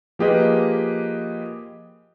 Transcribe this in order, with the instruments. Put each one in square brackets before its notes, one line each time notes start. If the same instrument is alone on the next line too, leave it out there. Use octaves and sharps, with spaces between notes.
[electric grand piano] F3 A#3 G4 G#4 B4 D#5